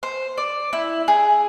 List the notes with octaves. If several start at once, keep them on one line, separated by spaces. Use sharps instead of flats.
C5
D5
E4
G#4